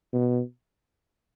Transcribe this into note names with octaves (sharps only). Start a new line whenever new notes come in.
B2